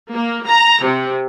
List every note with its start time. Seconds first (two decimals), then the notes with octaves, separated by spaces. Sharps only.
0.13 A#3
0.46 A#5
0.83 C3